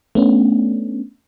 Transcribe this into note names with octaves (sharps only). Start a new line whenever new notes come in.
A3 B3 C#4 D4